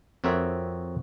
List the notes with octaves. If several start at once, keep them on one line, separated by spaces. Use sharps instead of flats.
F2 C4 F#4 A#4 C#5 E5